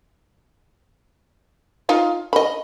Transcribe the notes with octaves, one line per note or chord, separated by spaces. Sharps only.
D#4 F4 F5
D#5 B5